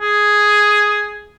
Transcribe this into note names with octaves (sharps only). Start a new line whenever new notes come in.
G#4